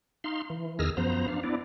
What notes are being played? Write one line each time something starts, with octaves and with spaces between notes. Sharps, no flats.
D#4 F5 C6
E3
E2 D#3 G#4 E6 F6 A#6
F#2 F3 B3 C5 A#5
D4 F5
B3 D4 E4 D5